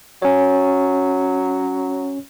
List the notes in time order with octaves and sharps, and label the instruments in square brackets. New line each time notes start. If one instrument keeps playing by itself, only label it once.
[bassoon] F#3 [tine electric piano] C#4 C#5